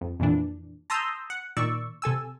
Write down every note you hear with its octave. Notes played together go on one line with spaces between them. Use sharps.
F2
F2 A#2 E3 D4
A5 A#5 C6 D#6 E6 G6
F#5
A#2 D#3 D5 C#6 E6
C3 A4 G#5 E6